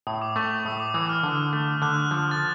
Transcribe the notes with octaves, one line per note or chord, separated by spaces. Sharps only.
A2 D#6
D6
A3 C#6
A2 D#6
D6
E3 D#6
F6
D3
A3
D3 F#6
F3
A6